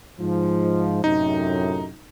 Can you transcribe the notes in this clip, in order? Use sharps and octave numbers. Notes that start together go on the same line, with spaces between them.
G#2 F3
F#2 A2 C3 D#4